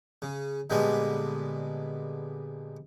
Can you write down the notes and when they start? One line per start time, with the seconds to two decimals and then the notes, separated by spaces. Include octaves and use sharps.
0.22 C#3
0.70 A#2 D3 G3 G#3 B3